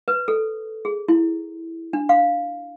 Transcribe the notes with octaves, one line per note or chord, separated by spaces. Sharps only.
B4
A4
G#4
E4
D4
F5